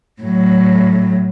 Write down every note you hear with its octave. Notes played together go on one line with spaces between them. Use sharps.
A2 F#3